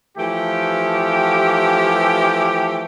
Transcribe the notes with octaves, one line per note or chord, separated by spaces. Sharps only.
E3 F3 A3 G4